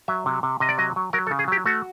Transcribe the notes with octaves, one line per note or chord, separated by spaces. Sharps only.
F#3 E5
C3
C3
C3 D#5
D5
F#3 D#5
F#3
F#3 A#4
A4
C#3
G#4
F#3 G4
A3 F#4